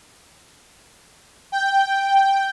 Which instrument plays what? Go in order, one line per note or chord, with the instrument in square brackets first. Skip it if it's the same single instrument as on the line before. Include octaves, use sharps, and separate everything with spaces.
[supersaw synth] G5